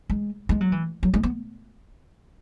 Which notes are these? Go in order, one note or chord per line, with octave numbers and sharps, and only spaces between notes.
G#3
G#3
F#3
E3
F#3
G#3
B3